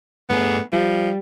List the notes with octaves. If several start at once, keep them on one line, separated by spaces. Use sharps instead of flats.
G2 A3 B3 G#4
F3 G3